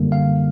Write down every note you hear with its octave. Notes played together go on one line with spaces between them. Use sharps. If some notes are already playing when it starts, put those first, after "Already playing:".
Already playing: F#2 D3 G3 A#3
F5